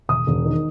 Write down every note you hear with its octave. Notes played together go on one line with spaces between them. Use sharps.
E1 D#6
E1
D#3